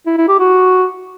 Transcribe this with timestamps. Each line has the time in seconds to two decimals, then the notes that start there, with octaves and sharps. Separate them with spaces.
0.06 E4
0.17 E4
0.28 G4
0.40 F#4